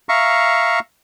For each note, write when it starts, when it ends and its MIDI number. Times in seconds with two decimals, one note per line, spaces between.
0.09 0.79 76
0.09 0.79 77
0.09 0.79 82
0.09 0.79 85